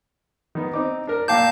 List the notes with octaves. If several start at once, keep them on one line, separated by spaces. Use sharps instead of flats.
D#3 B3
C4 D#4 D6
D4 A#4
A#2 F5 G5 A5 D6 G6